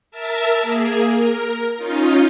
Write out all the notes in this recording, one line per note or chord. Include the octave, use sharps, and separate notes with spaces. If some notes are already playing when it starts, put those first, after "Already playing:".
A#4 E5 A5
A#3 G#4
A#4
C#4 D#4 F4